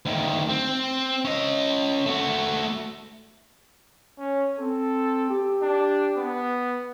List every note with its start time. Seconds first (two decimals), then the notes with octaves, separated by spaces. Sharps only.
0.05 D2 D#3
0.49 C4
1.25 C#4 D#5
2.06 A3 F#4
4.19 C#4
4.59 C4 A4
5.30 G4
5.62 D4
6.17 B3